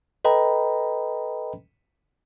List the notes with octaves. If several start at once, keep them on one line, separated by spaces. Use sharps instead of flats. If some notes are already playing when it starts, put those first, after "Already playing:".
A4 B4 D#5 G5 A#5 B5